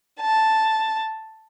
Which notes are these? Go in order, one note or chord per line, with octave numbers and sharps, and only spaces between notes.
A5